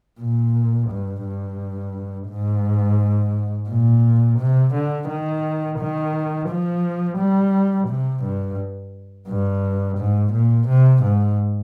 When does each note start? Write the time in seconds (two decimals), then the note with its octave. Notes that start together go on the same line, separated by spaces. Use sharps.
0.20 A#2
0.90 G2
1.24 G2
2.29 G#2
3.69 A#2
4.39 C3
4.74 D3
5.08 D#3
5.79 D#3
6.49 F3
7.18 G3
7.88 C3
8.24 G2
9.28 G2
9.98 G#2
10.33 A#2
10.68 C3
11.03 G#2